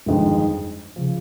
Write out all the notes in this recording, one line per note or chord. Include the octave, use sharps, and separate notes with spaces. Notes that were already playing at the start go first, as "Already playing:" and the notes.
G1 F2 D#3 G#3
C#3 F3